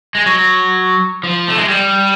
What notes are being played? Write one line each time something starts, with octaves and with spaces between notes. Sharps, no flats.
G#3
F#3
F3
A3
G#3
G3